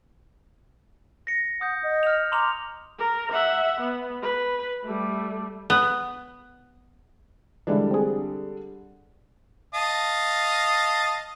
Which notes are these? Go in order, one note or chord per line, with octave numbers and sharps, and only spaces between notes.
A#6 C#7
F#5 D#6 G6
D#5
F6 F7
A#5 C6 D6 F7
A#4
E5 F#5
B3
B4
G3 A3
B3
D3 E3 G3 G#3 D4 E4
C4 G#4
D#5 F5 A5